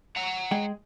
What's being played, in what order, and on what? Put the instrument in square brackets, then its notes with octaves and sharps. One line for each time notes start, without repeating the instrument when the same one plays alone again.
[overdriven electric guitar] F#5 A#5
[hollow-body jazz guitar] G#3 G#4 G5